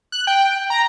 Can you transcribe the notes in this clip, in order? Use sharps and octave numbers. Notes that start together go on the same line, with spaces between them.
F#6
G5
A#5